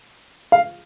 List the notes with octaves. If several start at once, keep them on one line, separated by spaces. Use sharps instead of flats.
F5